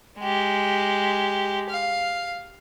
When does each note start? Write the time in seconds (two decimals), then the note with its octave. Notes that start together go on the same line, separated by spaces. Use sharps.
0.20 G#3 G4
1.70 F5